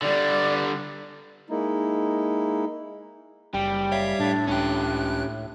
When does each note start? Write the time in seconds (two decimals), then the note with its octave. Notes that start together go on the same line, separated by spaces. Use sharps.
0.02 D3 G3 D5
1.50 G#3 A#3 D#4 E4
3.54 F#1 G3 G5
3.92 C#5 E5 F5
4.20 A2 D4
4.47 C#2 C#4 D4 G4 F#6